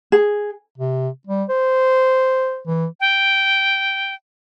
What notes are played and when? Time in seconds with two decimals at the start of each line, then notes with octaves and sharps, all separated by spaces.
0.12 G#4
0.78 C3
1.27 G3
1.49 C5
2.67 E3
3.00 G5